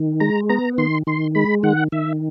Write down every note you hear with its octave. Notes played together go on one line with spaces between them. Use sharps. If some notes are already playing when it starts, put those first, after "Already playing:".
Already playing: D#3
G#3 A#5
B3 A#5
D#3 C6
D#3 C6
G#3 B5
D#3 F#5
D#3 E5